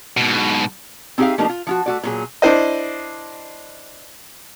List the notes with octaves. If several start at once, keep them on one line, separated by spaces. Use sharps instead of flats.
G#2 B2
C4 D#4 G4 G#4 E5 F5
F3 A3 A#3 D4 D#4 G4
F4
F3 F4 F#4
A3 F#4 D5
A#2 F#3 G#4
D4 E4 C5 D#5